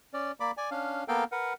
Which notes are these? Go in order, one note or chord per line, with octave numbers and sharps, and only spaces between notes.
C#4 D5
A#3 D5 B5 D6
D5 G#5
C#4 D4 F5
A#3 B3 A4 A#4 F5 G5
A#4 B4 F#5